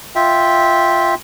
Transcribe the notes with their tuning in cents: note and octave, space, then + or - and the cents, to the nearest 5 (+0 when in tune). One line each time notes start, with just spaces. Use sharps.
F4 +0 E5 -10 G5 +0